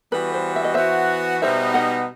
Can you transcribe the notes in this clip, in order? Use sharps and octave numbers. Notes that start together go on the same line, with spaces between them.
E3 G3 B3 F#4 B4
C5
E5
D#5
E3 B3 F#4 C5 E5
B2 G3 B3 D#4 C5 E5
D#5 F#5